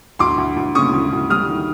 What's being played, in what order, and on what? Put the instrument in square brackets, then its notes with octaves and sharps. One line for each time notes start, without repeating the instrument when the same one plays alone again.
[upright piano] D2 C6 D6
D2
D2
C#3 C#6 D#6
D2
D2
G3 D#6 F6
D#3